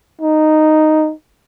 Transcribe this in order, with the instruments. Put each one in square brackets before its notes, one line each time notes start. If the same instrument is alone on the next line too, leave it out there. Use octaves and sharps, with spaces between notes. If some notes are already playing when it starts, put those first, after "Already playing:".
[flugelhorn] D#4